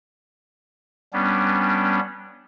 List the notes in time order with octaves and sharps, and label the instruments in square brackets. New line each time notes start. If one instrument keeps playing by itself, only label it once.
[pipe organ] G3 B3 C#4 D4